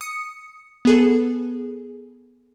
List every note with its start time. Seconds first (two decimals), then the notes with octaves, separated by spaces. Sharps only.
0.01 D#6 C#7
0.85 B3 G#4 A4